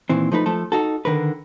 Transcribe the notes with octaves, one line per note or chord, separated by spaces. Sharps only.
A#2 D#3 E3 C4
F3 A3 D#4 B4
F3 A3 A4
D#4 F#4 A4
D3 D#3 A#4 B4